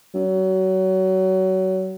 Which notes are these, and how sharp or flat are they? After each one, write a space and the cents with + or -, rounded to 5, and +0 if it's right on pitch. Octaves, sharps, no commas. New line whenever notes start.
F#3 +25